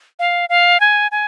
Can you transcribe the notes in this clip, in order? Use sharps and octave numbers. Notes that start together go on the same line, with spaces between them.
F5
F5
G#5
G#5